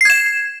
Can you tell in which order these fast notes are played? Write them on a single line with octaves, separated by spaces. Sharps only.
C7 G#6 E7